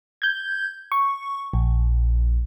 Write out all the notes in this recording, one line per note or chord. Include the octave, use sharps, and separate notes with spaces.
G6 G#6
C#6
A#1